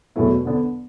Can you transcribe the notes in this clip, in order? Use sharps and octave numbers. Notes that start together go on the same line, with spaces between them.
E2 B2 F#3 A3 E4
D3 B3 D4